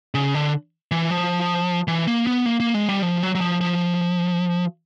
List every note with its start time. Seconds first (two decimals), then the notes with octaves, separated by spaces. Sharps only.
0.15 C#3
0.35 D3
0.91 E3
1.11 F3
1.88 E3
2.07 A#3
2.27 B3
2.46 A#3
2.60 A#3
2.74 G#3
2.89 G3
3.03 F3
3.23 F#3
3.35 F#3
3.41 F3
3.61 F3